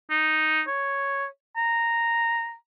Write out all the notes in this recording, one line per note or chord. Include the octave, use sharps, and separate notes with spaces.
D#4
C#5
A#5